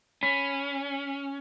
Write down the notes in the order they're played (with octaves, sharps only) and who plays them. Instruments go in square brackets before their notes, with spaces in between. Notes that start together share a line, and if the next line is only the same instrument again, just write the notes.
[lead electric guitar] C#4 [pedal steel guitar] B5